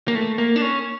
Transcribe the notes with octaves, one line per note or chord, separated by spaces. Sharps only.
A#3
A3
A#3
D4
C#4